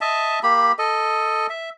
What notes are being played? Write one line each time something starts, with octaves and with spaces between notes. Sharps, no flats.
D#5 E5 A5
A#3 G4 B5
A4 D#5
E5